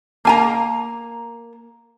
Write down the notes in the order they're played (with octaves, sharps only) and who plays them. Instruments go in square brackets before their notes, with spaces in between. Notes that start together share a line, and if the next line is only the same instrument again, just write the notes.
[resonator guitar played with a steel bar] A#3 G#5 A#5